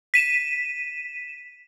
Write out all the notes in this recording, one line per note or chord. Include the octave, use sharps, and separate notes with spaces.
B6 D#7 E7